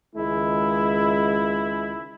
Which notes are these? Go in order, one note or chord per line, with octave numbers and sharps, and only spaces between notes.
C#2 D#3 G#3 E4